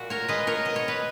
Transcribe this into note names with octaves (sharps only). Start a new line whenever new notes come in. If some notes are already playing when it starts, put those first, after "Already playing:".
Already playing: A#2 G#3 F#4
A#4 C#5
G#3 B4 D#5
A#4 C#5
B2 D#5
C#5
B4